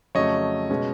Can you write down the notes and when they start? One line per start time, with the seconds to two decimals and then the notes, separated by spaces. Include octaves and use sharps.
0.15 F2 C#3 F#3 A3 C#5 D#5
0.70 B2 G#3 C#4